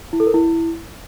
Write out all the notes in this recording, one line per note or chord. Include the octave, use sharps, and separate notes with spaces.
E4
A4
A#4
E4